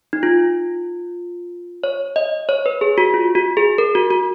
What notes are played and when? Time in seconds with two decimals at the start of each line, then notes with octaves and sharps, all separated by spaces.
0.13 D#4
0.23 F4
1.84 C#5
2.16 D#5
2.49 C#5
2.66 B4
2.81 G#4
2.98 F#4
3.14 F4
3.35 F#4
3.57 G#4
3.78 A#4
3.95 F#4
4.11 F#4